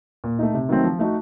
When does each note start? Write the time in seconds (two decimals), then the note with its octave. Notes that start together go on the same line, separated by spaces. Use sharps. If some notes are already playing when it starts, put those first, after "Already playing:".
0.24 A#2
0.39 A3 D#4
0.54 C3
0.69 D#3 F#3 A3 C4
0.84 F3
0.99 A3 D#4 F#4